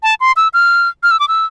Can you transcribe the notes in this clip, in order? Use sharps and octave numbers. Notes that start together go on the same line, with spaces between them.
A5
C6
E6
F6
F6
E6
D6
E6